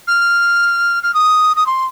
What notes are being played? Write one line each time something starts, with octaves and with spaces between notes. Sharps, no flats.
F6
F6
D#6
D#6
C6